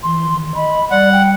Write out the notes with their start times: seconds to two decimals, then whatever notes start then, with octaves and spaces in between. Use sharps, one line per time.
0.03 E3 C6
0.31 D#3
0.55 D#5 B5
0.91 G3 D5 F#5
1.13 G5